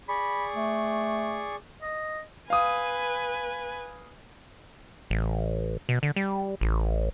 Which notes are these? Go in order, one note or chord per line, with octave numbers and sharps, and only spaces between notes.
G#4 D5 B5 C#6
A3
D#5
B4 F5 G#5 D#6
A1
B2
D3
G3
A1